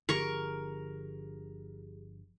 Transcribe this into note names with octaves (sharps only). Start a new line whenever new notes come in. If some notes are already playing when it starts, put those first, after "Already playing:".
G1 D3 F3 G4 G#4 A#4 C#6